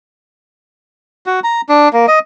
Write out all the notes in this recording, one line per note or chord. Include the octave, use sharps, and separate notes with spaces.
F#4
A#5
D4
A#3
D#5